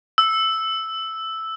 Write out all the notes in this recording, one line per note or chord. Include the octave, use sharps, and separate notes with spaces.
E6